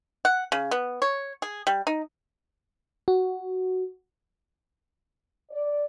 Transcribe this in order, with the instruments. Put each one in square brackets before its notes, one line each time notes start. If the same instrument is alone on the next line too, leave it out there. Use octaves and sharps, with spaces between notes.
[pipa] F#5
C#3
B3
C#5
G#4
G3
D#4
[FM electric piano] F#4
[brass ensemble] D5